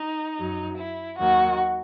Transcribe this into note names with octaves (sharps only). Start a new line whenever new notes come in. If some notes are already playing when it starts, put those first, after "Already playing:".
Already playing: D#4
F#2 F#3
E4
D#2 D#3 F#3 F#4